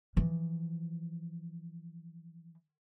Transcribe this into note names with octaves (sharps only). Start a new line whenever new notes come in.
E3 F3